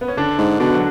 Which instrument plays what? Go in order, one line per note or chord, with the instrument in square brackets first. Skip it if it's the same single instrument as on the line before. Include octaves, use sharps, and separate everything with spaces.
[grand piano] B3
C#4
D3 D4
[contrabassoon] G#2
[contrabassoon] B2 [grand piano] D3 D4
[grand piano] F#3 F#4